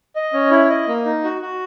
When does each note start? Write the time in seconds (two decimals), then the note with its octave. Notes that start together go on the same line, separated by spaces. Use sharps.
0.16 D#5
0.33 C#4
0.51 E4
0.70 D#5
0.88 A#3
1.05 D#4
1.24 F#4
1.42 F#4